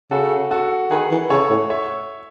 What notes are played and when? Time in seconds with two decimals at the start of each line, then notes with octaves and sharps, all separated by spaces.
0.11 C#3 F#4 A4
0.51 F#4 A4
0.90 D#3 G#4 B4
1.11 E3
1.30 C#3 A4 C#5
1.50 A2
1.70 C#5 E5